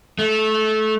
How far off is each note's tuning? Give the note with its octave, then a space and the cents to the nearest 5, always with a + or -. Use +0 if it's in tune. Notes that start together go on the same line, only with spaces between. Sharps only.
A3 -20